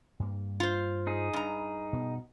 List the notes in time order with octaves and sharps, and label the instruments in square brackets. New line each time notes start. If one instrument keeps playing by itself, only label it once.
[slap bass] G2 A#3
[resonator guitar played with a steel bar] F4 C5
[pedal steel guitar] D#4 G#4
[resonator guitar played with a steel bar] G2 A#5
[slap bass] B2 B3